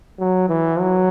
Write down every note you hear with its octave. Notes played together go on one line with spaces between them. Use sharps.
F#3
E3
F#3